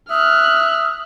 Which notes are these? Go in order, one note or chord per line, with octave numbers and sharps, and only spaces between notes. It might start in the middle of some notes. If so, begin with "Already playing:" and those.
E5 D#6 F6 F#6